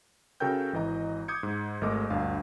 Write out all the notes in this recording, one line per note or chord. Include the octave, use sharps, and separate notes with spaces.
C#3 F#4 A4 A#4 G5 G6
G#1 E3 D#5 A#5
D6 D#6 G6 G#6 C#7
G#2
G#1 G#3 A3 A#4 D#5 D6
G1 D2 D4 F5